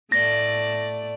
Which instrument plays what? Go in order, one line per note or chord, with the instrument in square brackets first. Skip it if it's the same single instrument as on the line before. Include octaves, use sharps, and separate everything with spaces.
[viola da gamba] A2 A3 D5 [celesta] A#6